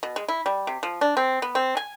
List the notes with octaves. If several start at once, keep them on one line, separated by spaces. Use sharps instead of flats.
B2
G#3
E4
G3
C3
F3
D4
C4
B3
C4
G#5